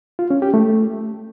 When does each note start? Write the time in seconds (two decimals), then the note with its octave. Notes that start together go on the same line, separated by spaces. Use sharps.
0.19 F4
0.31 C#4
0.42 G4
0.54 A3